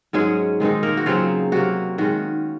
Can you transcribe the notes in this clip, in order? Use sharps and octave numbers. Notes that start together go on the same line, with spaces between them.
G#2 F#3 G#3 C#4 G#4
D#3 G#3 C4 D#4
A#3 A#4
F#4
C#3 F#3 C4 F4
C3 F#3 A#3 F#4
D#3 G#3 C#4 F#4